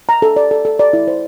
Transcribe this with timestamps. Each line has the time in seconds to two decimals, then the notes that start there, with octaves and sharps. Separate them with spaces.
0.09 A#5
0.22 A4
0.36 D5
0.51 A4
0.65 A4
0.79 D5
0.93 E4
1.07 C5